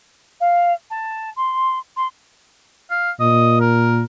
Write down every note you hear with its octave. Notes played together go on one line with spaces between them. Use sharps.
F5
A5
C6
C6
F5
A#2 D#5
A#4